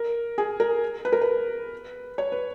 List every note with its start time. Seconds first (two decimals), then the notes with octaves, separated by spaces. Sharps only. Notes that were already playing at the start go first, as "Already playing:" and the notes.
Already playing: A#4
0.38 G#4
0.60 A#4
1.05 B4
1.12 A#4
1.21 B4
2.18 C#5
2.32 B4